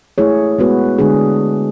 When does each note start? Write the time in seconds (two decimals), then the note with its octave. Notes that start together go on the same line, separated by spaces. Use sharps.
0.18 A3 E4 G#4 C#5
0.58 G#3 B3 F#4 B4
0.99 D3 G#3 D4 G#4